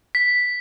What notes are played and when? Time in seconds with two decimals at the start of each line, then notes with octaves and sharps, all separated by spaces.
0.15 B6